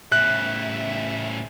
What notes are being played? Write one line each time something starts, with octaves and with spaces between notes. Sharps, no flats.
A2 C#3 E5 F#6